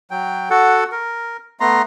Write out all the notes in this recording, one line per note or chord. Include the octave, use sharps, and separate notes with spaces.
F#3 G5
F#4 A4 F#5
A#4
A3 B3 A#5 C6